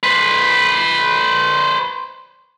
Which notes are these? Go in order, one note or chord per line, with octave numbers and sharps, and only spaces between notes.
B4 C5